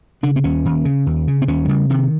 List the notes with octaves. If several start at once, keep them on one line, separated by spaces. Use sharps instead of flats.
C#3 D4
C4
D#2 C#4
D#2
C#3
D#2
C#3
C4
D#2 C#4
F#3
C#3 G3
C3 D#3